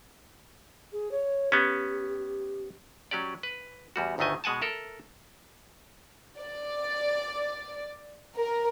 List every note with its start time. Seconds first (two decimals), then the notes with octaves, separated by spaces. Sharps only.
0.92 G#4
1.11 C#5
1.52 B3 C#4 G4
3.11 F#3 C#4 G4 D5
3.43 B4
3.96 E2 G3 F#4
4.18 G1 D2 D#3 A3 D#5 G#5
4.44 B2 G#3 F#5 G#5 A5
4.61 A4 A#4 E5
6.41 D5
8.37 A#4